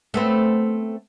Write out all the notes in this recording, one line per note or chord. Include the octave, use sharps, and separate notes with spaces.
A3 B3 C4